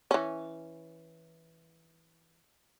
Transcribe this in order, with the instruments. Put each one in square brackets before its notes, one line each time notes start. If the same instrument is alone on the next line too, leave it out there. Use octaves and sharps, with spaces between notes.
[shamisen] E3 C#4